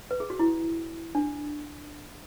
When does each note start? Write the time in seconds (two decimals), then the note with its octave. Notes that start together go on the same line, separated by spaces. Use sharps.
0.11 B4
0.20 G#4
0.30 F#4
0.39 E4
1.15 D4